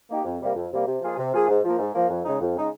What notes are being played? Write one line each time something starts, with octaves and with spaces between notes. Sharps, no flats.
A#3 D#4 G4
F2
C3 G3 A#3
F2
C3 G3 A#3
C3
F3 A#3 F4 G#4
C3
F3 A#3 F4 G#4
G#2
F3 A#3
G#2
F3 A#3
F2
C#3 G#3 D#4
F2
C#3 G#3 D#4